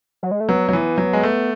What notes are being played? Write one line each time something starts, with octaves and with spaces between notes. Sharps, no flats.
F#3
G#3
A3
F#3 B3
F#3
E3
F#3
G#3
A3